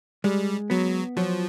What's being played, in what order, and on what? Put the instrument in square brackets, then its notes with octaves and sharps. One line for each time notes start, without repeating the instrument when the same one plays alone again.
[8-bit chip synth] G3 [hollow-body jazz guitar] G#3
[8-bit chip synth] F#3 [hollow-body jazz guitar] B3
[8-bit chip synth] F3 [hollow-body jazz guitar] F#3